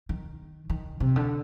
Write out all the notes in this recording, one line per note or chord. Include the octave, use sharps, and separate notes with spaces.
D#3
D#3
C3
D3